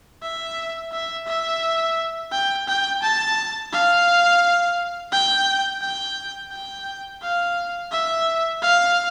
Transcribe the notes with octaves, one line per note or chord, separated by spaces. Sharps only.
E5
E5
E5
G5
G5
A5
F5
G5
G5
G5
F5
E5
F5